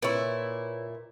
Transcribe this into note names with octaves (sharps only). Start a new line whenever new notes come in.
A#2 E4 B4 C#5 C#6